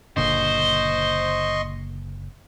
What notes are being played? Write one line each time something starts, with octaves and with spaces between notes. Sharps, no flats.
F#1 A#2 D3 C5 D#5 C6 C#6